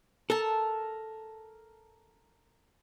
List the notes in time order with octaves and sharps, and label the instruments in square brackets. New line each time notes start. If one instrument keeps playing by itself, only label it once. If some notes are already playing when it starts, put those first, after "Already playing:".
[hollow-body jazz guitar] A4 [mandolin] A#4 A5